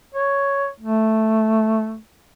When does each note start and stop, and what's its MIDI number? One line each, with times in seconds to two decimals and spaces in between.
0.15 0.67 73
0.80 1.98 57